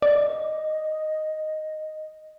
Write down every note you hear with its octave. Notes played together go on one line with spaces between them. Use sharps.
D5 D#5